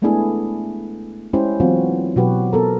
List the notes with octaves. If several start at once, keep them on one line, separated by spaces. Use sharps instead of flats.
G#3 A3 B3 D4 E4 G#4
G#3 C#4 E4 G4 C5
E3 F#3 B3 C4 F4 F#4
B2 F#3 F#4 G4 B4
B3 A4 A#4